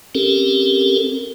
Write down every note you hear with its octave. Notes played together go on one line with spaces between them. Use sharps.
C4 C#4 G4 A4 A#4